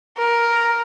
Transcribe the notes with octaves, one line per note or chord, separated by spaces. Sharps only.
A#4